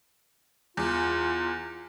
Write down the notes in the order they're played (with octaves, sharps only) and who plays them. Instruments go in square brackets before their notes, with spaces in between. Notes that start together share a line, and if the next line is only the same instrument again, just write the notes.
[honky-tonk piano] E2 [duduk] F4